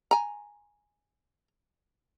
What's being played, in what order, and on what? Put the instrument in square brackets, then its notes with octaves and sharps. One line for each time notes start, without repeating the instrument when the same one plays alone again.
[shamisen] G#5 A#5